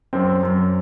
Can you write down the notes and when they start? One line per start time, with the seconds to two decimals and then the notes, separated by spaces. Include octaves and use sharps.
0.13 F#2 C4
0.43 F#2